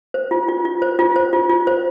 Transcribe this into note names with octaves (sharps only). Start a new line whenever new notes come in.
C5
F4
F4
F4
C5
F4
C5
F4
F4
C5